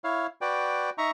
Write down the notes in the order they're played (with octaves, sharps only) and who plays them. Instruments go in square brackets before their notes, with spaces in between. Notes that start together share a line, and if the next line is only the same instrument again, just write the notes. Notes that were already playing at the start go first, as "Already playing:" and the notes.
[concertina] E4 C#5 F5
F#4 B4 D5 G5
D#4 E5 A#5 C#6